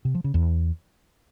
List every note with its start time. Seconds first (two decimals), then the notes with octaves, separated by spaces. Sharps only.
0.05 C3
0.15 F3
0.24 C#3
0.34 E2